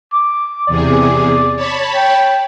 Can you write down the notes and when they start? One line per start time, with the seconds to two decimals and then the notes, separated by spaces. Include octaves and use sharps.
0.13 D6
0.68 E2 C3 G#4 D5
1.56 C#5 A5 B5
1.95 G5